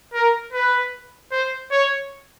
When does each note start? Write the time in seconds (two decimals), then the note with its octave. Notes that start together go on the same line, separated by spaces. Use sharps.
0.14 A#4
0.53 B4
1.32 C5
1.71 C#5